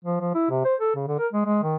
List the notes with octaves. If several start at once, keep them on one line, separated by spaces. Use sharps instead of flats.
F3
F3
E4
C3
C5
A4
C#3
D3
A#4
G#3
G#3
D#3